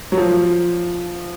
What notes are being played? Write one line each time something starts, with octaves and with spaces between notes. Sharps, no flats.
F#3
F3